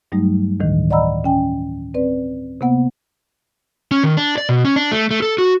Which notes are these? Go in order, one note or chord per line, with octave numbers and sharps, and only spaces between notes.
G2 F#3 G3 A3 D#4
D2 A2 D#3 E3
D5 D#5 F#5 A#5 B5 E6
C#4 G5 G#5
C4 B4 D5
C3 A#3 B3 F#5
C#4
D#3
D4
D5
B2
C#4
D4
A3
A3
A4
F#4